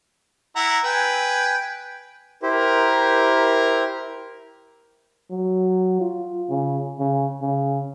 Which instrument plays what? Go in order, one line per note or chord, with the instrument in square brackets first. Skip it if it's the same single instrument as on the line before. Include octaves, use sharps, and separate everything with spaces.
[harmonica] E4 F#5 A#5
B4 G5 G#5
[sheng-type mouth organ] E4 G4 C5 [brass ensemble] A#4
[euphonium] F#3
F4
C#3
C#3
C#3